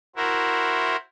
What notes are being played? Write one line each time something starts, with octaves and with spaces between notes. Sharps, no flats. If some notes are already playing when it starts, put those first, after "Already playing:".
E4 F#4 A#4 C5